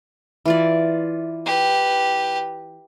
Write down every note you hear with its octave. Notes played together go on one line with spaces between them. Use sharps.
E3 F4 D5
G4 B4